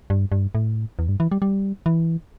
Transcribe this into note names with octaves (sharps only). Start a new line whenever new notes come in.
G2
G2
A2
E2
G2
E3
G3
G3
E3